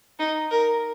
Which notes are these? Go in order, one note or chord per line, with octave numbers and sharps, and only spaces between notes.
D#4
A#4